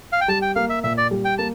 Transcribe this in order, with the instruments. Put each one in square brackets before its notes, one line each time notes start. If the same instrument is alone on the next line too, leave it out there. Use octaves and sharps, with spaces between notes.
[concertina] F5
G5
[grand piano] G3 [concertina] A5
[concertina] G5
[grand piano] A#3 [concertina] F5
[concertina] E5
[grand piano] A#2 [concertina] E5
[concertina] D5
[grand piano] G3
[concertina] G5
[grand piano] A#3 [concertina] A5